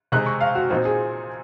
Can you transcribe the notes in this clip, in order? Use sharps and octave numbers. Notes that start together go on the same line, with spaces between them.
C3 D#3 G#3 C4 D#4 F#6
C#6
F5
F#4
A#2 F3 C4 D#4 F#4
G#4